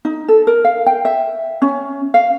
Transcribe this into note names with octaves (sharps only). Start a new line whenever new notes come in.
D#4
A4
A#4
F5
G5
E5
C#4
F5